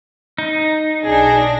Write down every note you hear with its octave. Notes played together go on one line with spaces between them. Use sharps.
D#4
B1 D4 G#4 A#6